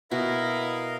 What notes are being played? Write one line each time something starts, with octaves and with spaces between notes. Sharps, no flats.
B2 E4 F#4 A#4 D#5 F5